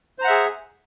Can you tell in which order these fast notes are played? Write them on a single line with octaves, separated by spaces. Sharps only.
C5 A#5 F#5 E5 G#4